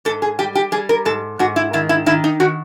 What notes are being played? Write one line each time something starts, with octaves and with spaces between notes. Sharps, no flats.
G#2 A4
G#4
G3 G4
G4
G3 G#4
A#4
G#2 A4
G#2 F#4
E4
D#3 E4
E4
D#3 E4
D#4
D#3 F#4